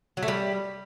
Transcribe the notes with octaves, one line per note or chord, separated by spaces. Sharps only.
F#3
A3
G3